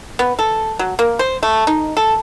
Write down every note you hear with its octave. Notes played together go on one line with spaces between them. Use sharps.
B3
A4
F#3
A#3
C5
A3
D#4
A4